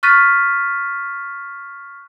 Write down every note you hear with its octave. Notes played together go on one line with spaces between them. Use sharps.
C#6 F6 F#6 A6 B6 D#7